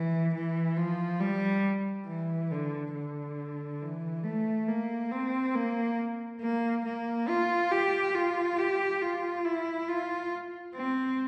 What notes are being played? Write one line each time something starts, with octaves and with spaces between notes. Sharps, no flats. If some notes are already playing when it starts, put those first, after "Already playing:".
Already playing: E3
E3
F3
G3
E3
D3
D3
E3
A3
A#3
C4
A#3
A#3
A#3
F4
G4
F4
G4
F4
E4
F4
C4